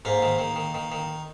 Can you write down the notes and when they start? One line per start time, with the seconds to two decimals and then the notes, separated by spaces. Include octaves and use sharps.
0.05 G#2 A#3
0.22 D#3
0.39 D#3
0.56 D#3
0.74 D#3
0.92 D#3